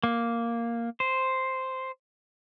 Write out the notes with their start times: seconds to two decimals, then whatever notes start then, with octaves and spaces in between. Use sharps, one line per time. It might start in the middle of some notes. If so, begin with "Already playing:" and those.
0.03 A#3
1.00 C5